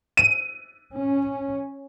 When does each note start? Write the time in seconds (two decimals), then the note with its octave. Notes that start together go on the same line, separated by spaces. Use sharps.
0.17 D#7
0.97 C#4